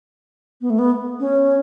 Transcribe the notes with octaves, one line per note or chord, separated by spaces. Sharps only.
B3
A3
B3
C#4